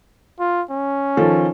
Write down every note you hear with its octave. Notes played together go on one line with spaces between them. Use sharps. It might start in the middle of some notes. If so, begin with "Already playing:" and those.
F4
C#4
D#3 F3 A4